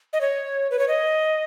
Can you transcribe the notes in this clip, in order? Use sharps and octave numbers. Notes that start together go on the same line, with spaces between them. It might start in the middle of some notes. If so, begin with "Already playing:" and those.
D#5
C#5
B4
C#5
D#5